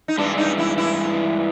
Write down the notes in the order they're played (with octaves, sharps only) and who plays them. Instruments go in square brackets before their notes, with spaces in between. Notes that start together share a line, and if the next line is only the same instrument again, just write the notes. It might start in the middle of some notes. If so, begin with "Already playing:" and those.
[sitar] D#4
[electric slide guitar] G2 E3 G#3 [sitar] D4
[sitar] D#4
E4
E4